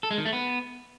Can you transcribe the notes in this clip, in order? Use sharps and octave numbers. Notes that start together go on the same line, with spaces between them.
A4
G#3
D#3
A3
B3